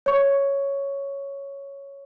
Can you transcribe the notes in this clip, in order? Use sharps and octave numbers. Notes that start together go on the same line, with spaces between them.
C#5 C#6